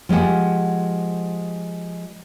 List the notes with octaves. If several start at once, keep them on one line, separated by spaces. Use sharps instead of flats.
F3 G#3 G4 F#5